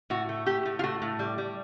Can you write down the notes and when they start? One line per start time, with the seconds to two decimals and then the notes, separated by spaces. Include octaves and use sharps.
0.10 A2 F#4
0.29 A3
0.46 A3 G4
0.66 A2
0.79 F4
0.83 A3 F#4
1.02 A2
1.19 G3
1.38 G3